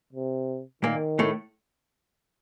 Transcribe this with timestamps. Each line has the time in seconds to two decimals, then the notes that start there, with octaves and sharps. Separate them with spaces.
0.13 C3
0.83 A#2 D#3 A#3
1.19 A2 A3